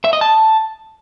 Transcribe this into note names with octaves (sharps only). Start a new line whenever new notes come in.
E5
D#5
A5